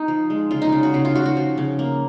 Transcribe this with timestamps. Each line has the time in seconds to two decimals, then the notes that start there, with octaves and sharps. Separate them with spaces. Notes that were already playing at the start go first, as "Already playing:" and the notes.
Already playing: D#4
0.08 F3
0.30 G#3
0.51 C#3 F4
0.62 D#4
0.72 C#3
0.83 F#4
0.94 C#3
1.05 F4
1.15 C#3 F#4
1.26 F#4
1.37 F3
1.57 C#3
1.79 A#3